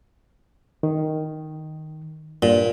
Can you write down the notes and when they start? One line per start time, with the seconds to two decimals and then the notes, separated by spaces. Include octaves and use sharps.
0.83 D#3
2.42 G2 A#2